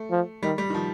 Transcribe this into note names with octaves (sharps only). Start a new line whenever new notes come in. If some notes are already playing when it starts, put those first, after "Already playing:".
Already playing: A3
F3
D#3 G3
G3
D#3
F3